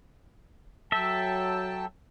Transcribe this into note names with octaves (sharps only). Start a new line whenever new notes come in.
F#3 A4 E5 G5 A5